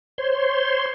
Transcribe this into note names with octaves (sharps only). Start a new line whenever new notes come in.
C5 C#5 C6